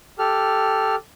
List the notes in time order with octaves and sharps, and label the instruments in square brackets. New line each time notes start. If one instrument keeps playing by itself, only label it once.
[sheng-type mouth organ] G4 A4 F6